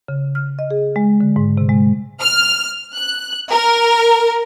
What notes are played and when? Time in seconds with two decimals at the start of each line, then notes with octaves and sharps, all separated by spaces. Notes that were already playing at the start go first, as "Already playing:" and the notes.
0.08 C#3
0.35 F6
0.59 D#5
0.71 G#4
0.96 G#3
1.21 D3
1.36 G#2
1.58 C3
1.69 G#3
2.20 F6
2.95 F#6
3.52 A#4